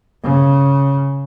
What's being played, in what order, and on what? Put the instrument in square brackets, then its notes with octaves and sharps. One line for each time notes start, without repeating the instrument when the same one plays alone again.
[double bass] C#3